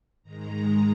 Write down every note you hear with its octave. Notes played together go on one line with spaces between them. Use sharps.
G#2 D#3 G#3 A#5